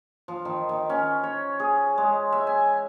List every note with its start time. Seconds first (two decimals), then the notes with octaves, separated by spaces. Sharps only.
0.28 F3
0.45 D#3
0.69 D#3
0.89 C#4
1.23 C#5
1.60 G#4
1.98 G#3
2.32 E5
2.47 G#5